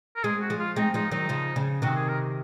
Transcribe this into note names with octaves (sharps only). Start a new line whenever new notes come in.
A#4
G#3 C4 G#4
F#4
F3 G#3
F4
G#3 C4 D#4
F3 G#3 D#4
D#3 F#3 D#4
C#3 F3
C#3
C3 D#3 F#4
G#4
A#4